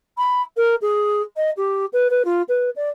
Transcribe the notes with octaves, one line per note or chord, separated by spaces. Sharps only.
B5
A#4
G#4
D#5
G4
B4
B4
F4
B4
D5